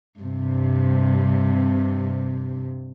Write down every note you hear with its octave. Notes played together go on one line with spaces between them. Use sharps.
G2 C3